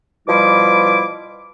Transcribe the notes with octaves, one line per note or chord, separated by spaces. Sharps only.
B2 F3 G3 E4 D6